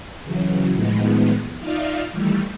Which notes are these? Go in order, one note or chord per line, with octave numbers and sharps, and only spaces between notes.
C#3 E3 F#3
A2 D#3 F3 G#3 B3
D#4 F4 D5 E5 F5
D#3 E3 G3 A3